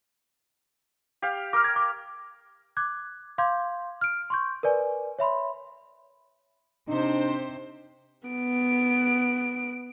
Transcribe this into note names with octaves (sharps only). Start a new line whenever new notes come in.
G4 F5
A#4 D6 F6
G#6
D6
D6 F#6 G#6
F5 C6 D6 G6 G#6
F6 D7
C6 C#6 G6
A#4 B4 D5 G#5
C#5 E5 B5 C6
C3 D4 D#4 C5
B3 D7